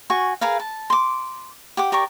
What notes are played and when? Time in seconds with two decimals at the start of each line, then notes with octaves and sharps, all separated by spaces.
0.10 F#4 G#5 C#6
0.41 G#4 A#4 B4 F5
0.60 A5
0.90 C6 D6
1.77 G4 F#5 D6
1.92 G4 A#4 D5 C#6